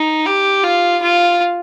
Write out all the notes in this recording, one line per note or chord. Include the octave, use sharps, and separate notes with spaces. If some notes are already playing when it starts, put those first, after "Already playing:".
Already playing: D#4
G4
F4
F4